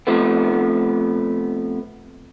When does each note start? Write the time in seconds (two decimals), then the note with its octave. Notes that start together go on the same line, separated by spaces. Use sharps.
0.07 C3 F3 A3 B3